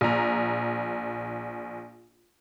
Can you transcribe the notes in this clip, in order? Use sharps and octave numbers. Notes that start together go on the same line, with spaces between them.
A#1 A#5